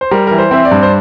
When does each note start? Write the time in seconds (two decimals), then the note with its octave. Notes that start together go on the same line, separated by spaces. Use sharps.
0.01 C5
0.11 G3 A#4
0.27 E3 A#4
0.38 C5
0.51 C4 E5
0.65 D5
0.71 G2
0.83 C5